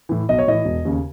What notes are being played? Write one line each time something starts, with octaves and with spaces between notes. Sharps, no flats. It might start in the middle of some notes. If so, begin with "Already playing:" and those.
A2 E3
B1 D#5
C#5
A2 E3 D#5
E1
D#2 C#3